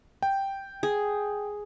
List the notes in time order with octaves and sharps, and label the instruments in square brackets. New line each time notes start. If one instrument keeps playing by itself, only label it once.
[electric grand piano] G5
[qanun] G#4